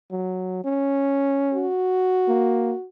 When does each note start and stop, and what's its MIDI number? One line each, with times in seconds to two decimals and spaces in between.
0.11 0.61 54
0.64 1.67 61
1.54 2.86 66
2.28 2.73 58